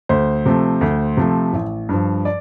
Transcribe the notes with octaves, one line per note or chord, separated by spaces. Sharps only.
D2 C5
C3 F3 A3
D2
C3 F3 A3
A1
G2 F3
D5